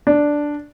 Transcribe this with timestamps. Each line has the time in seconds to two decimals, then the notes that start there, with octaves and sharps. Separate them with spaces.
0.07 D4